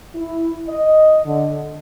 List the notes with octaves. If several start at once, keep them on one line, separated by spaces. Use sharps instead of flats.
E4
D#5
D3